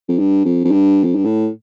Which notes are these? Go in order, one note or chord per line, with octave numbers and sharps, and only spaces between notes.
F2
G2
F2
F2
G2
F2
G2
A2